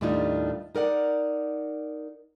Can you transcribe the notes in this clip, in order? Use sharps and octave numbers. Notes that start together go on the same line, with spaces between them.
D#2 A2 G3 D4 D#4 F4
D#4 A#4 D5 F#5